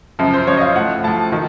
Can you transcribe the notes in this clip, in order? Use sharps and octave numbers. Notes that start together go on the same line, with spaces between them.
F#2 C#3 F3
C5
F#2 C#3 F3 C#5
D#5
F5
A2 F3 F#5
A2 F3 A5
D#3